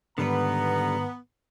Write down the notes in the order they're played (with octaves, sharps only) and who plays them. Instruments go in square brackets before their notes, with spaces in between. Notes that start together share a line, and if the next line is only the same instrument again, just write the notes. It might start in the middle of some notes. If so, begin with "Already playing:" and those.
[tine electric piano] G#2 D#3 [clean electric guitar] D3 G3 B4 [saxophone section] B3 [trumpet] A#5